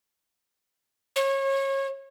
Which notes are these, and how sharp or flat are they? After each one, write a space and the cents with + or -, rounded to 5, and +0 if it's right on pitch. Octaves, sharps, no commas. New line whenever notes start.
C#5 -30